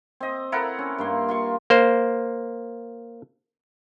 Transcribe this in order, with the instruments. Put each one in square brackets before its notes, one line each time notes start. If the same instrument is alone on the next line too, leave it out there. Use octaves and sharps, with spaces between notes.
[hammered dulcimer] C4 D#5
E4 A4 A#4 F#5
C#4
G2 A#3 C6
F4 C6 C#6
[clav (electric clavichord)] A#3 C5